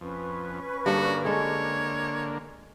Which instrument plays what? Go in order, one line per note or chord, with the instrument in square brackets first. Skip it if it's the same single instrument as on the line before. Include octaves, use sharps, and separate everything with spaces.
[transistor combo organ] F2 [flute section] C#4 B4 C#6
[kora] G2 A4 [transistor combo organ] D3 A#3 [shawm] F#4
[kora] G#3 A4 [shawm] C#5